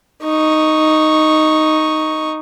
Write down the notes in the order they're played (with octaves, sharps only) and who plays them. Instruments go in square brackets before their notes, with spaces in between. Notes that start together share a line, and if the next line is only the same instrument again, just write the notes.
[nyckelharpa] D#4 C#6